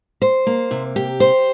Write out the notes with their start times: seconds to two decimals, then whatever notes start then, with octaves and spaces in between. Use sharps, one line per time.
0.22 C5
0.47 A#3
0.71 C3
0.96 G4
1.20 C5